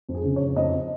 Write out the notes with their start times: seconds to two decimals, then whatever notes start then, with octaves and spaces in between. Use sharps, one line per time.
0.09 F2
0.15 G#4
0.25 C#3
0.36 C#5
0.41 F2
0.56 F2 D#5